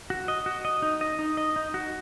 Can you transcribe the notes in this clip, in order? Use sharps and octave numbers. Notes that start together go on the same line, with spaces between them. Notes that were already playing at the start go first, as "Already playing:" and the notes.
F#4
D#5
F#4
D#5
D#4
D#5
D#4
D#5
D#4
F#4